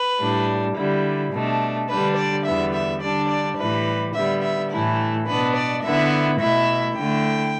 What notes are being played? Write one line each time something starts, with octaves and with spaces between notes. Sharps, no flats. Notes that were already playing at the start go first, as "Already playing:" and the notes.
Already playing: B4
A2 G3 D4
D3 G3 E4
B2 A3 D4
D3 G3 D4 B4
D5
E2 D3 G3 B3 E5
E5
D3 G3 D4 D5
D5
A2 E3 G3 B4
D3 G3 B3 E5
E5
A2 E3 A3 E4
B2 B3 D4 B4
D5
D3 B3 E4 E5
B2 A3 E4 E5
D3 A3 E4 G5